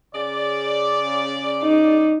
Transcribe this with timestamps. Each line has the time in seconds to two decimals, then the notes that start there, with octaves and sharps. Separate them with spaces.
0.14 C#3 D5
1.63 D#4